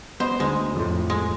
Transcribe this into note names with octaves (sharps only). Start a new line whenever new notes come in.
B3 C5 D#5
D2 G#3 D#4
F2 A2
G#3